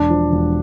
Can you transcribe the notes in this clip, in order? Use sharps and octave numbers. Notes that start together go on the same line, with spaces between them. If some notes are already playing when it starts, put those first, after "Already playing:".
Already playing: E1 D4
F3
E1